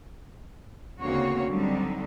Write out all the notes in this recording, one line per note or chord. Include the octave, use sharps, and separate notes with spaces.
D2 C#3 A#3 C4 F#4 C#5
D3 F#3 G3 C4 D#4